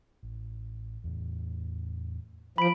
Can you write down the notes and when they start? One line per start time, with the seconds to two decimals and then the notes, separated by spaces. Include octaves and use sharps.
0.23 A1
1.04 E2 A2
2.58 F3 B5 D7